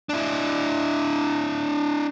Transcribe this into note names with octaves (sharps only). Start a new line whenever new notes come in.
D4 E4